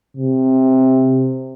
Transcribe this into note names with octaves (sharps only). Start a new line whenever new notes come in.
C3